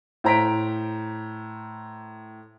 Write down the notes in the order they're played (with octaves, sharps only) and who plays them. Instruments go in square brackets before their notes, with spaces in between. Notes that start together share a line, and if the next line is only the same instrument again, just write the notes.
[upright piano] A2 C5 A#5 B6 D7